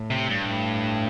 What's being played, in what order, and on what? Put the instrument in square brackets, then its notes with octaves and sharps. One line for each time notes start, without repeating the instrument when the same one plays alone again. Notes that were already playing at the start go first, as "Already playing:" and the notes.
Already playing: [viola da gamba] A2
[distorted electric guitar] C3
G2
[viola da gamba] A2